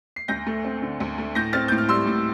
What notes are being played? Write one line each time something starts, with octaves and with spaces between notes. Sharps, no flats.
C7
D2 G6 A#6
A3
C4
D3
D2
A3
A2 G6 A#6
C4 F6 A6
A2 G6
F6
G3 C6 E6
A2